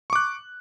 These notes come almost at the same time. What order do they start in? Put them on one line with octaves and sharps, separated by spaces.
C#6 D6 F#6